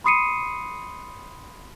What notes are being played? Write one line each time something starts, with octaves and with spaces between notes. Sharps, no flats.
B5 C6 D#6 C7 C#7 D#7